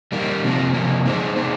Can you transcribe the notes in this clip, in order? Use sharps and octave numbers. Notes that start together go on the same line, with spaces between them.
D#3 G3 A#3
C3 F3 A#3
C3 F3 A#3
A#3 D#4 G#4 C5
A#3 D#4 G#4 C5